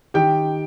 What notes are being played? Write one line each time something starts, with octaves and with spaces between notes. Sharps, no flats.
D#3 G4 G5